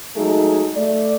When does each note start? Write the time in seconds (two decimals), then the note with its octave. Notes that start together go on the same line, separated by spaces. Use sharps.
0.17 F#3 G#3 A3 D#4 G#4
0.76 A3 D5